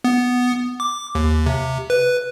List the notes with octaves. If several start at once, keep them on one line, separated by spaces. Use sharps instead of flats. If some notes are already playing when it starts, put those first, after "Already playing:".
B3
D6
D#2
C3
B4